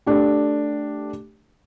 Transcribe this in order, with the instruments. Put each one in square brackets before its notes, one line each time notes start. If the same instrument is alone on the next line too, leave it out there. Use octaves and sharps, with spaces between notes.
[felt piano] A3 D4 G4